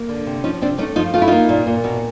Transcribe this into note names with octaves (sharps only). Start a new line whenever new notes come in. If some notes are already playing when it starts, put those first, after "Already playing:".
Already playing: A#3
D3
C3
F3 C#4 D#4
C3 C4 D4
A3 C#4 D#4
F3 D#4 F4
A3 F4
E4
A#3 D#4 F4
A#2
A#2
B2